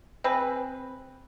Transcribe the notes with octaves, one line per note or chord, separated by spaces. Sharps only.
C4 G#4 B4